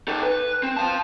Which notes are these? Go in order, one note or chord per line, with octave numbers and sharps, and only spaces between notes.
D#4 A4
B4
C4
F5 A5